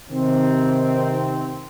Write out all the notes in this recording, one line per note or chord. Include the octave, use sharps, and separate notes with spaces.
C3 D#3 C4